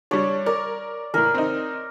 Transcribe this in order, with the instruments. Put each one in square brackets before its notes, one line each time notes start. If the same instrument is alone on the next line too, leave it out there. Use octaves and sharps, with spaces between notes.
[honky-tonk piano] G3 D4 [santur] C#5
[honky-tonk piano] A#4 [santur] D5
[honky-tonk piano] A2 E3 [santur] A#4
[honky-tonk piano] C4 D#4